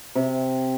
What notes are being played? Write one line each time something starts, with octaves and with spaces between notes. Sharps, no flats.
C3